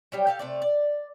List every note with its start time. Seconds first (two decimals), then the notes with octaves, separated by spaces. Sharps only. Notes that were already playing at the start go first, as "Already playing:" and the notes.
0.12 F#3 G3 G4
0.27 G4 A4 F5
0.39 C3 A3 D5
0.62 D5